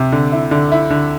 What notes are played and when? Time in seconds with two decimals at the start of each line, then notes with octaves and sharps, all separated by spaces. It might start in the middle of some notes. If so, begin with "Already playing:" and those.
Already playing: C3
0.12 D3
0.32 E4
0.51 D3
0.72 E4
0.90 D3